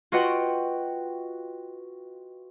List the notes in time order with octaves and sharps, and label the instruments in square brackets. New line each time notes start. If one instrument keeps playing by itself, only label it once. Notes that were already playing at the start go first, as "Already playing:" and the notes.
[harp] F4 F#4 B4 D#5 F#5 G5